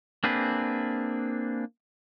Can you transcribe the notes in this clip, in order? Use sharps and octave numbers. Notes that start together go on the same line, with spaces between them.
A#3 C4 D4 G#4 B4